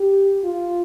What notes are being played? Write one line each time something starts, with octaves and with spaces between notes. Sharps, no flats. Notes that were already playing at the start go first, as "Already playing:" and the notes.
Already playing: G4
F4